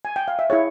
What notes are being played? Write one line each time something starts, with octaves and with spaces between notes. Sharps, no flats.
G#5
G5
F5
E5
E4 G#4 C#5